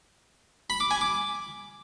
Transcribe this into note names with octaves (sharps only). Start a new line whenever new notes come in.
B5
D6
G#5
D6